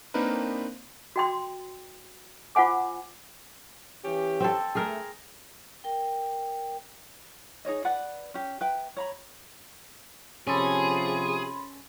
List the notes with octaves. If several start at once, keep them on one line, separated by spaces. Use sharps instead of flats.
A#3 C4 D4 D#4 A#4 B4
F#4 G5 C6
F4 C5 F#5 G#5 D6
E3 C#4 G4
C4 A4
A3 G#4 A#4
A#4 G5
D#4 G#4 C#5 D#5
B4 D5 F#5 B5
C#4 G4
B4 E5 G5
C#5 A#5 B5
C3 F3 C#4 G#4 A4 B5 C6